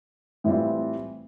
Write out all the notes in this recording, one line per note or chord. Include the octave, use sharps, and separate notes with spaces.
A2 E3 G3 C4 F4